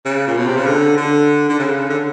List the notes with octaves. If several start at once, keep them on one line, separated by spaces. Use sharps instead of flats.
C#3
A#2
B2
C3
C#3
D3
D3
D3
C#3
D3